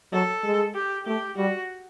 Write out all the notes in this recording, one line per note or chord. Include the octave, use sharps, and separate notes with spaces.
F#3 A4
G#3
G4
A3 G4
G3 F#4